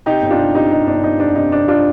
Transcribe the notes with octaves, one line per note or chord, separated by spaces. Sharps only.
C3 D#4 G4
G1
D4 F4
C3
C3 D#4
C3 D#4
G1 D4
C3 D#4
F2 D4
C3 D#4
C3 D4
D4 F4